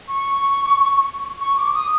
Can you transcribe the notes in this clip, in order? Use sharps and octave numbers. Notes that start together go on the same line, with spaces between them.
C#6
C#6
D6
D#6